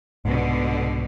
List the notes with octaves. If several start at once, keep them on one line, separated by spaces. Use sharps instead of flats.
C2 G#2 B2 D3